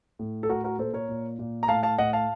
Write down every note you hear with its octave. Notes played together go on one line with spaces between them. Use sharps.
A2
A4
A2 F#4 A#4
F#4 A#4
A#2 A4 C5
A#4 C#5
A#2
A#2
A#5
A2 F5 A5
F5 A5
A2 D#5 F#5
F5 A5